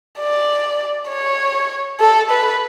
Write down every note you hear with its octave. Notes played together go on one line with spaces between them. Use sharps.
D5
C#5
A4
B4